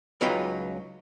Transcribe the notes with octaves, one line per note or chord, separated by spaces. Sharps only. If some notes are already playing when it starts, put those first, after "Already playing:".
C#2 F#3 D#4 F4 B4 G5